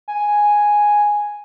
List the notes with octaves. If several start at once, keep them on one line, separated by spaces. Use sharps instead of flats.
G#5